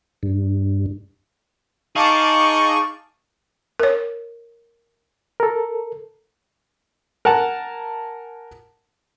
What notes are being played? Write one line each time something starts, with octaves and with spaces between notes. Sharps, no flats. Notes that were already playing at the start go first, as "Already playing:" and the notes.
G2
D#4 G#4 F5 A5 C#6 D6
A#4 C#5
A4 A#4
A#4 F#5 G#5 A5